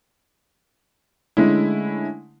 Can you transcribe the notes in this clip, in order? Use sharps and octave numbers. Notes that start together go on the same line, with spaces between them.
D3 G#3 A3 C#4 E4